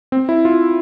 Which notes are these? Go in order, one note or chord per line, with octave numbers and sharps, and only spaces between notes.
C4
E4
F4